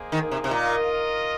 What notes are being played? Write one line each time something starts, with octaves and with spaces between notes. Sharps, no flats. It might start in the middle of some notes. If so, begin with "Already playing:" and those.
Already playing: A#3 G#4 C5 D#5
D#3
C3
C3
A#2 F4 A#4 D#5